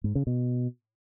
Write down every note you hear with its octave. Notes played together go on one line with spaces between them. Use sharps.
G#2
C#3
B2